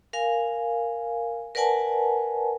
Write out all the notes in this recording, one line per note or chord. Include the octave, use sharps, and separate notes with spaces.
A#4 F5 G#5
A#4 B4 D5 F#5 G#5 A5